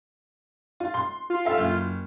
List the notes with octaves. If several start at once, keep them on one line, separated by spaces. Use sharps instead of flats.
F4
C6
F4
A4 E5 F5
F#1 F6